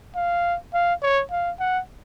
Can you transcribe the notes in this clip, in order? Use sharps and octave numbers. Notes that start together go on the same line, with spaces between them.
F5
F5
C#5
F5
F#5